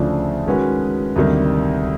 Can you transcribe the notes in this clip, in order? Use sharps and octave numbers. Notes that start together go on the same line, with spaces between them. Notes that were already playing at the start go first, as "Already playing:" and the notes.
Already playing: D2 C#3 F3 A3 D4
D#3 G#3 C#4 F#4 B4
D2 C3 D#3 G3